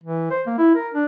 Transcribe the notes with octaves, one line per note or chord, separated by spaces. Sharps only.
E3
C5
A#3
E4
A#4
D4